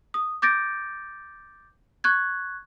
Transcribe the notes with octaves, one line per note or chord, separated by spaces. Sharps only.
D#6
D6 G6 A6 A#6 D7
C#6 F#6 G#6